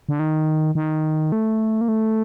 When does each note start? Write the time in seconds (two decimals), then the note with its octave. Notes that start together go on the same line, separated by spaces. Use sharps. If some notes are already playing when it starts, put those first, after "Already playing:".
0.09 D3
0.19 D#3
0.75 D#3
1.32 A3
1.81 A#3
1.88 A3